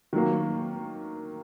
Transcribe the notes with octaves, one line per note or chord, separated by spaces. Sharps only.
D#3 F#3 A#3